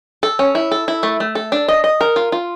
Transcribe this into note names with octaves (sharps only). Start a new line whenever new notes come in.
A4
C#4
E4
A4
E4
A3
A3
A4
D4
D#5
D#5
A#4
F4
F4